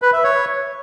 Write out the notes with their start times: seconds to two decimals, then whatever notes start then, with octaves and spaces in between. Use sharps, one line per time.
0.02 B4
0.13 E5
0.24 C#5